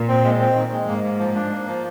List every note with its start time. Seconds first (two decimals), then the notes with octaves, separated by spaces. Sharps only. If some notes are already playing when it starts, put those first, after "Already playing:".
Already playing: A#2
0.08 C4
0.24 G#3
0.41 C4
0.55 D#3
0.72 G#3
0.88 G#2 A#3
1.04 A#3
1.19 F3
1.35 D4
1.52 A#3
1.67 F3